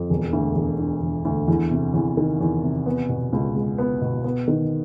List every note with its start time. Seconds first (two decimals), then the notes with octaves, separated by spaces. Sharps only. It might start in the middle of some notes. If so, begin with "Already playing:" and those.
Already playing: F2
0.10 E1
0.33 D2
0.56 E1
0.79 D3
1.02 E1
1.25 D2
1.48 E2
1.71 C3
1.94 E2
2.17 D#3
2.40 E2
2.63 C3
2.86 B3
3.09 B2
3.33 C#2
3.56 G#3
3.78 B3
4.01 B2
4.24 B3
4.48 D#3